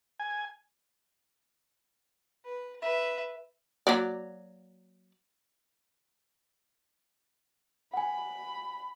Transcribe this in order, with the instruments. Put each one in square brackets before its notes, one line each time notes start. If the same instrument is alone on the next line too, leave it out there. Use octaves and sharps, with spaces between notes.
[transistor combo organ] G#5
[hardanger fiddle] B4
B4 E5
[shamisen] F#3 A#3 D5
[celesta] F#5 G#5 [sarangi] B5